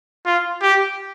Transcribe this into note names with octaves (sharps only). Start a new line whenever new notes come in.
F4
G4